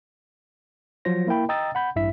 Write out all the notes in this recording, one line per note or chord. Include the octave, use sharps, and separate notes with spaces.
F3 F#3 F4 C5 A#6
A#3 E4 A#4 G5 B5
D#5 G5 A#5 D#6 E6 A6
F#5 B5 G6
A1 G2 E4 E5 B6